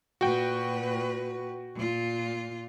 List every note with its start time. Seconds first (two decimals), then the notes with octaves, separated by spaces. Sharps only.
0.21 A#2 F#4 B4 G5
1.75 A#2 F4